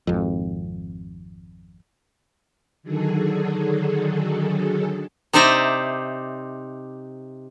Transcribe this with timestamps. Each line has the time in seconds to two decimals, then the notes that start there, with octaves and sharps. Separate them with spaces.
0.07 G#1 F2
2.83 D3 D#3 F#3 G#4 A4
5.33 C3 D#4 C5 D5 E5 A#5